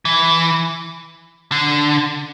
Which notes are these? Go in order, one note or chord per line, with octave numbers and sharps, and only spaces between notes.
E3
D3